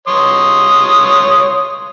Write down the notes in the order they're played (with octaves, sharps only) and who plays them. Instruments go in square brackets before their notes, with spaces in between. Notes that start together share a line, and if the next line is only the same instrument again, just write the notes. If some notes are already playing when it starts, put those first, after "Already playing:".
[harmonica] C#5 C6 D#6